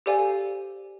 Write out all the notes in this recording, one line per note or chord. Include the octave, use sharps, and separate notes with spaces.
G4 A4 C5 D5 F5 G#5